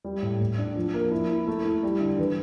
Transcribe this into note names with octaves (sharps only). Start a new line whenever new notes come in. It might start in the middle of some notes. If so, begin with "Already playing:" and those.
G3
A2
A2
D4
F3
A#3
E4
E4
A3
E4
G3
D3
E3